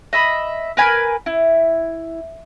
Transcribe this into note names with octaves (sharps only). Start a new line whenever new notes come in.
D#5 E5 B5
A#4 B4 G#5 B5
E4